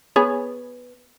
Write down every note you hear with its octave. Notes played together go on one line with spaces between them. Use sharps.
B3 G#4 C#5